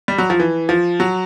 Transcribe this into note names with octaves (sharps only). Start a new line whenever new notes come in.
G3
F#3
F3
E3
F3
F#3